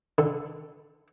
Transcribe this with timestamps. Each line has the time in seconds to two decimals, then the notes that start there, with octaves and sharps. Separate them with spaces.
0.18 D3